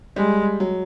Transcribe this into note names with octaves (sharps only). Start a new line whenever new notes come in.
G3 G#3
F#3